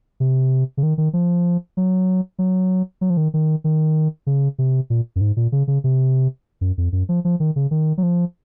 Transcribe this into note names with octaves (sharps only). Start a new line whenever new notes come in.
C3
C#3
D#3
D#3
F3
F#3
F#3
F#3
F3
D#3
D#3
D#3
C#3
C3
A#2
F#2
G#2
A#2
C#3
C#3
C3
F#2
F2
F#2
F3
F3
D#3
C#3
D#3
F#3
F3